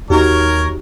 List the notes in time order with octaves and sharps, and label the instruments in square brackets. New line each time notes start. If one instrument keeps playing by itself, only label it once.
[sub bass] D#2 [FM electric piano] D#4 F#4 G4 [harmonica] A#4 [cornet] C#5